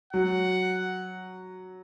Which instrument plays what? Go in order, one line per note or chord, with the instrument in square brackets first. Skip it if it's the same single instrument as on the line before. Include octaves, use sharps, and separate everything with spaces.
[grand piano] F#3 [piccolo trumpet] F#5